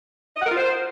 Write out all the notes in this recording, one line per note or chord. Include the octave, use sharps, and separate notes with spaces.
D#5
F#5
A#4
F4
C5